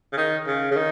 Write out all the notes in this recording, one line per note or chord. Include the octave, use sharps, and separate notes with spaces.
C#3
D#3
C#3
C#3
D#3